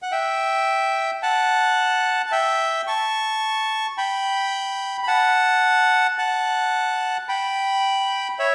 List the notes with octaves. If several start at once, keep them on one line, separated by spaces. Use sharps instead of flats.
F#5
E5 G5
F#5 A5
A5
E5 G5
A5 C#6
G5 B5
B5
F#5 A5
F#5 A5
G5 B5
C#5 E5